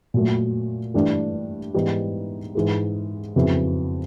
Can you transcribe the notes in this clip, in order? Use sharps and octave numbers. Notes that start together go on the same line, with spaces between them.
A#2 F#3 A3
G2 E3 A3 D4 G4
G#2 E3 G3 B3 D#4
G#2 E3 G#3
F2 C#3 F#3 B3 E4